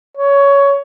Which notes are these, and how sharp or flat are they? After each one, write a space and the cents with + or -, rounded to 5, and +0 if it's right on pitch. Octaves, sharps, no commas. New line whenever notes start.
C#5 +15